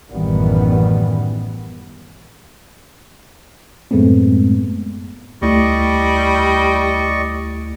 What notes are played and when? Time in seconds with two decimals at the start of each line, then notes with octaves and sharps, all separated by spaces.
0.11 A1 F#2 D#3 E3 G3 B3
3.91 F#2 A2 G#3 A3 B3 C4
5.42 D2 G3 A3 E4 D5 D#5 C#6